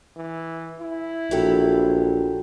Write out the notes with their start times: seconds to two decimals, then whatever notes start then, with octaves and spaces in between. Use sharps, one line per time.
0.17 E3
0.81 E4
1.31 A#1 F#3 G4 A4